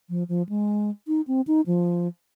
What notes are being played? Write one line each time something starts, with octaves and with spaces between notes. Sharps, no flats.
F3
F3
G#3
D#4
C4
D#4
F3